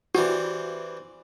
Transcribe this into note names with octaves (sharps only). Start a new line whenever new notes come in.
E3 G3 C4 F#4